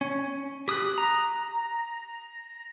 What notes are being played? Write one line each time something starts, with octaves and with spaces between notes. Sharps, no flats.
C#4
G4 D#6 E6 F#6
A#5